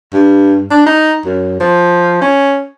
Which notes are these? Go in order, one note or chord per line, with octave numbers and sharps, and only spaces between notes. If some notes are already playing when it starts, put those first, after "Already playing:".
G2
D4
D#4
F#2
F3
C#4